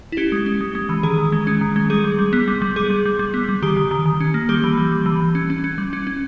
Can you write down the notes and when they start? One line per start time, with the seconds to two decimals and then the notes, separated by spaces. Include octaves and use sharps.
0.12 E4
0.17 C#4 G4
0.32 G#3
0.46 C#4
0.61 G#3
0.75 G#3
0.89 E3
1.03 D#3 G#4
1.18 D#3
1.32 G#3
1.47 C#4
1.61 D#3
1.76 G#3
1.90 G3 G#4
2.04 G3
2.19 G3
2.33 B3
2.48 G3
2.62 G3
2.76 G3 G#4
2.90 G3
3.06 G3
3.19 G3
3.34 B3
3.49 G3
3.62 D#3 G4
3.77 D#3
3.91 D#3
4.06 D#3
4.20 C#4
4.34 A#3
4.49 G3 G4
4.64 E3
4.77 G3
4.92 G3
5.06 E3
5.20 E3
5.35 C#4
5.50 C#4
5.64 C#4
5.78 G3
5.93 C#4
6.07 C#4